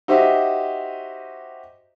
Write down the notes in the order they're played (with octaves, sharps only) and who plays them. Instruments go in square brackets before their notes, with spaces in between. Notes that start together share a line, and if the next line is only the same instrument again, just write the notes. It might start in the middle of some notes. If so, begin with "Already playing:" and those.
[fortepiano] D#4 F#4 G4 C5 D#5 E5